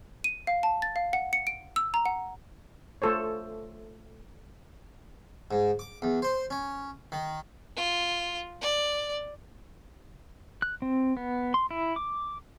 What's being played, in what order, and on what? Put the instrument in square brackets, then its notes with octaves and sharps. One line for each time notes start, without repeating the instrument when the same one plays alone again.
[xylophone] D#7
F5
A5
A6
F5
F#5
C#7
D7
E6
A#5
F#5
[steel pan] A3 F4 A4 C5 C#5
[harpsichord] G#2
D6
E2
C5
C#4
D#3
[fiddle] F4
D5
[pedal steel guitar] F#6
C4
B3
C6
E4
D6